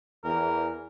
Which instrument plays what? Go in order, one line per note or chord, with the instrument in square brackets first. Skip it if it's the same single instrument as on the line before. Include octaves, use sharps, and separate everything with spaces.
[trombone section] E2 [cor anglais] A#4